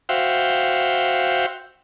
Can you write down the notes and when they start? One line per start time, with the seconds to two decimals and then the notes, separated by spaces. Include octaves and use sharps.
0.09 F#4 C5 E5 F5 G5